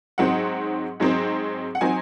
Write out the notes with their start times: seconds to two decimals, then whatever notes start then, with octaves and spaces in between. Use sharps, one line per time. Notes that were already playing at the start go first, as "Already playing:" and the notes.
0.18 G#2 F#3 C4 D#4 F#5
1.00 G#2 F#3 C4 D#4
1.75 F#5
1.81 F#3 C4 D#4 G#5